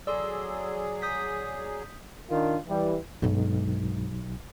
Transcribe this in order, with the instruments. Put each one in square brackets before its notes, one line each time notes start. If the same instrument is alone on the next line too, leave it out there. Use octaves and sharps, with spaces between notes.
[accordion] F#3 G#4 [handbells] A4 C6 E6 [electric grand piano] D5
[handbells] D#6 G6 B6
[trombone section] D#3 D4 F4 A#4
E3 G3
[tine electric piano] B1 [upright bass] G2 G#3